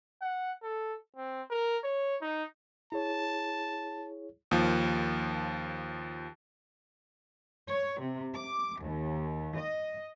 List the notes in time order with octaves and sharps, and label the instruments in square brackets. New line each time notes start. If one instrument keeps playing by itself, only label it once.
[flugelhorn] F#5
A4
C4
A#4
C#5
D#4
[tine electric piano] E4 G#4 C#5 [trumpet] A5
[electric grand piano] D#2 F3
[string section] C#5
C3
D6
D#2
D#5